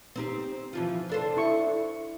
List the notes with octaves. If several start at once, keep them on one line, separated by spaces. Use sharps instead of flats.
C4 D#4 G4
E3 F3 F4
D4 A4 C5
E4 C#6